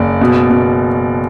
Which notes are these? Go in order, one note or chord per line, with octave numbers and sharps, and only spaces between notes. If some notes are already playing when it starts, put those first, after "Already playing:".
Already playing: F#1 D5
B2
B2